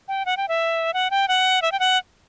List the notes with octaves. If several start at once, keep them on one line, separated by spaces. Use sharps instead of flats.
G5
F#5
G5
E5
F#5
G5
F#5
E5
G5
F#5